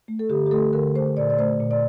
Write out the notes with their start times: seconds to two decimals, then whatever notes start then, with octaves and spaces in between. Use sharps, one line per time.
0.08 A3
0.19 A4
0.29 D3 G4
0.46 G4
0.51 A3 A4
0.73 D3 A#4
0.95 A3 C5
1.17 A#2 D5
1.30 D5
1.38 A3 C5
1.60 A#2
1.71 D5